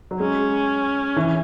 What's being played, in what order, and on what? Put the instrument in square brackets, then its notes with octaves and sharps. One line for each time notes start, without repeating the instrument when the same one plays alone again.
[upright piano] F#3
[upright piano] G#3 [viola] C#4
[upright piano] E3